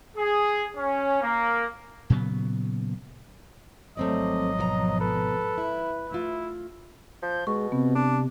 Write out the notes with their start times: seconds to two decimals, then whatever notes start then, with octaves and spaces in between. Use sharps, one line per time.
0.15 G#4
0.75 C#4
1.21 A#3
2.10 A#2 C#3 F#3 B3
3.97 G#1 F3 F#3 A3 C4 D5 D#5
4.59 B2 D5 A#5
5.00 A4 B4
5.58 E4
6.11 A3 E4 F4
7.22 F3 G6
7.47 B2 G#3 C#6
7.72 C3 B3
7.95 D4